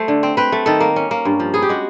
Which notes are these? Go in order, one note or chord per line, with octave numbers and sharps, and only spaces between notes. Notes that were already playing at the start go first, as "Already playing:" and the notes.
Already playing: A3 C5
D3
C4
C4 B4
A3
D#3 A4
A#3
C#4
A#3
G2
F3
B3 G#4
G4
G#3 F#4